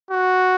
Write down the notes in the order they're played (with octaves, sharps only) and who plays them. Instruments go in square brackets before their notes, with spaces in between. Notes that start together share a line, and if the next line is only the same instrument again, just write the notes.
[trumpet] F#4